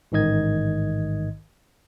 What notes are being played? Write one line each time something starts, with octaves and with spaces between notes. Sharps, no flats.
A1 G#2 D#3 D#5 G#6